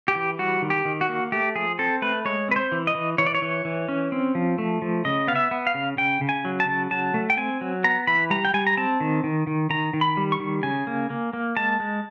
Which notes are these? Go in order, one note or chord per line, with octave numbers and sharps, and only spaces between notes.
G4
E3
G3 F#4
D#3
G4
D#3
F#4
A#3
A3 G4
F3 G#4
C4 A4
A3 B4
G#3 C#5
C4 B4
C5
E3
D#5
E3
E3 C#5
D5
C#5
E3
E3
C#4
C4
F3
A3
F3
C#3 D#5
B3 F5
E5
B3
F5
C#3
C#3 G5
C#3
G#5
F#3
A5
C#3
F#3 A5
A3
G5
C4 G#5
F#3
B3 A#5
E3 B5
G3 A#5
G5
G3 G#5
A#5
C4 A5
D#3
D#3
D#3
D#3 A#5
D#3
B5
G3
C#6
D#3
C#3 G#5
A#3
A#3
A#3
G#3 A5
G#3